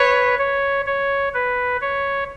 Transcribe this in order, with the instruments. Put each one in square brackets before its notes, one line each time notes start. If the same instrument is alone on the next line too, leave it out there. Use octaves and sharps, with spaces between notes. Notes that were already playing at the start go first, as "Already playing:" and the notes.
Already playing: [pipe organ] B4 [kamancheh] C#5
[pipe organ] C#5
C#5
B4
C#5